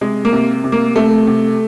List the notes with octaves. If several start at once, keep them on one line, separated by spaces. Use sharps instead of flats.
C3 G#3
A#3
C3
C3
A#3
C3 A3
C3